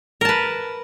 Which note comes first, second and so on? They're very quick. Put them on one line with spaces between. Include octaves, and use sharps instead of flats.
A#4 A5 B4